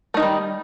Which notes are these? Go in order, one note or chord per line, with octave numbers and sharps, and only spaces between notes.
D#3 G3 A3 D#4